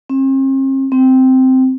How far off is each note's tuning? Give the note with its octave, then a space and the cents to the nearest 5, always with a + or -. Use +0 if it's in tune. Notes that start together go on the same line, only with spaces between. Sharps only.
C4 +45
C4 -10